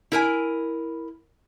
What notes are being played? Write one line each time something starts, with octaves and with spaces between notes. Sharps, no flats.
E4 A#4 G#5